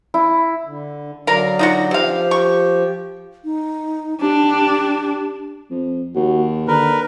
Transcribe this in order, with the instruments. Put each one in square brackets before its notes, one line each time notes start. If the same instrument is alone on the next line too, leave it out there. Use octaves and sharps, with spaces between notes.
[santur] E4
[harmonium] D3
[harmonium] D3 F#3 D5 [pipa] A#4 F5
[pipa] D#4 F4 F#4
[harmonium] F3 G4 [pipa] C4 F5
[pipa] C#6
[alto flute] D#4
[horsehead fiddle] D4 [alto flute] G4
[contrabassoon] F2
[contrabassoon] D#2 [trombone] F#4
[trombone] D3 [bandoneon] A#4 B4